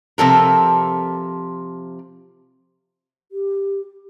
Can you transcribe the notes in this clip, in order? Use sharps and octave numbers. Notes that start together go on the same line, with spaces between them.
C3 F3 A4 A#4
G4